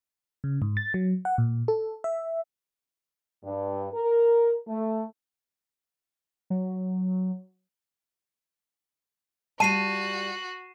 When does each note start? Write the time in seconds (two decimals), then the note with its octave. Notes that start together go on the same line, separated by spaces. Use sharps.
0.44 C#3
0.62 G#2
0.77 A6
0.94 F#3
1.25 F#5
1.38 A#2
1.68 A4
2.04 E5
3.44 G2
3.93 A#4
4.68 A3
6.50 F#3
9.60 G3 F4 F#4 A5 C7 D#7 E7